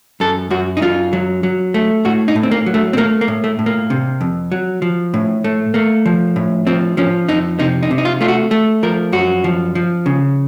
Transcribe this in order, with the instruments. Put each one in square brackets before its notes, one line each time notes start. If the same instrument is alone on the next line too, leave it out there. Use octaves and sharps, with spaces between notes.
[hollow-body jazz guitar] F#2 A4
F#2 F#4
D#4
F#2 F4
F#3
F#3
A3
A2 F#4
D#4
A2
C4
A#3
F#3
A3
C4
A3 A#3
A#3
A2
A3
A2
A#3
C3
F2
F#3
F3
A2
A3
A3 A#3
F3
A2
F3 C4
F3 C#4
F2 D#4
C3 D#4
D#4
C3
D#4
F4
A3 F4
F#4
A3
F3 A#4
F#2 F#4
F3
F3
C#3